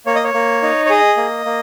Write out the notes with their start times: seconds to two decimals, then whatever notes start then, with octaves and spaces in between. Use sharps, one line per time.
0.06 A#3 C#5
0.15 D#5
0.24 C#5
0.34 A#3
0.63 D#4
0.86 C#5
0.90 G#4 D#5
1.17 A#3
1.46 A#3